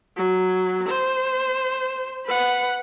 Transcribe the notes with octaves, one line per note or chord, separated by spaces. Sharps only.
F#3
C5
B4 F#5